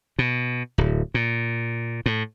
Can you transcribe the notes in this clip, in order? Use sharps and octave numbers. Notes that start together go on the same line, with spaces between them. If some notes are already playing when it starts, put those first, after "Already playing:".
B2
D1
A#2
A2